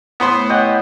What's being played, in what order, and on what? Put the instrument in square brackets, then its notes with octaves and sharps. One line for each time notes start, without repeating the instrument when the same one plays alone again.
[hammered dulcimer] A2 [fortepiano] B3 B4 C5
[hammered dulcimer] G4 [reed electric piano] C#5 D#5 F#5